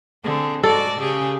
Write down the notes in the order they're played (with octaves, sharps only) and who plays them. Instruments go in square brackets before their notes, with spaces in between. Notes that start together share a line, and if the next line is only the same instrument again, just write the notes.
[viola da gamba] D3 C4 G#4
[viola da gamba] G#2 F#4 D5 [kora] A4
[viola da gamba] C#3 G4 G#4